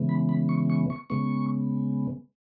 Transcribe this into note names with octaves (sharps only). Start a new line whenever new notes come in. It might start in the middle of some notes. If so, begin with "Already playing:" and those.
Already playing: C#3 E3 G#3 B3
B5
B5
C#6
C#6
C#6
C#3 G#3 B3 C#6